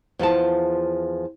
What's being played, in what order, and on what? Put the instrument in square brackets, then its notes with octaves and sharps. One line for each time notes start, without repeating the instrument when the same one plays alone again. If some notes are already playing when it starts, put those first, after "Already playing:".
[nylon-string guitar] E2 F3 F4 A5